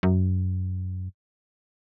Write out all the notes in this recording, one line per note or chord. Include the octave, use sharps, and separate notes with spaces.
F#2